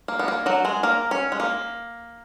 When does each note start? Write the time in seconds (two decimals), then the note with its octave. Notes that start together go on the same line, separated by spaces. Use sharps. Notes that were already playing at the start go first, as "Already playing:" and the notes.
0.08 A#3
0.19 B3
0.28 A#3
0.46 F#3 F#4
0.65 G#3 G#4
0.83 A#3 A#4
1.11 C#4
1.32 G#3
1.40 A#3